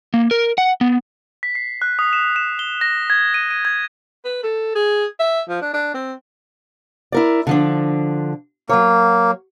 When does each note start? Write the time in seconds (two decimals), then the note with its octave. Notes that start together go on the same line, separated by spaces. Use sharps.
0.14 A#3
0.31 A#4
0.58 F#5
0.81 B3
1.43 B6
1.55 C7
1.82 F#6
1.99 D#6
2.13 E7
2.36 E7
2.59 G7
2.81 A#6
3.10 G#6
3.34 D#7
3.50 D#7
3.65 G#6
4.24 B4
4.43 A4
4.75 G#4
5.19 E5
5.49 F3
5.62 D4
5.74 D4
5.94 C4
7.12 E4 A#4 D5
7.47 D3 F3 D4
8.69 F#3 A#3 C#5